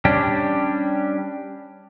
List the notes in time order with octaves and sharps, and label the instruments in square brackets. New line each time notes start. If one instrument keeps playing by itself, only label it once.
[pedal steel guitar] G3 C#4 D4 G4